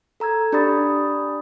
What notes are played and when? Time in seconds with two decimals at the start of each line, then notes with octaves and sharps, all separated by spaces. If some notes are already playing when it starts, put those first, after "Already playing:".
0.20 A4 A#5 E6 G#6
0.52 D4 G4 D5 B5 D#6 A6